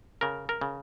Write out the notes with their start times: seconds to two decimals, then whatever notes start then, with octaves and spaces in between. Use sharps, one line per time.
0.21 C#3 A#4
0.49 A#4
0.61 C#3